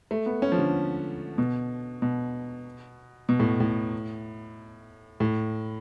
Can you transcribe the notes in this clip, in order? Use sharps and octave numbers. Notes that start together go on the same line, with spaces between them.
A3
B3
C#4
F3
D3
B2
B2
B2
A2
A2
A2